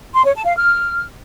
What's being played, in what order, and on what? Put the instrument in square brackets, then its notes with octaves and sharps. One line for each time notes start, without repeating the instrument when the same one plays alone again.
[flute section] C6
C#5
A5
F5
F6